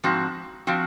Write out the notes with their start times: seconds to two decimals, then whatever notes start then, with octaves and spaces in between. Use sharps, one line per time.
0.04 G#2 F3 C4 F#4
0.67 F3 C4 F#4